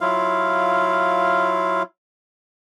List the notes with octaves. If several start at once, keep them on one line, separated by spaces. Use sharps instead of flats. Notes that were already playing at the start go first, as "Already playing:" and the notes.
F#3 E4 F4 F5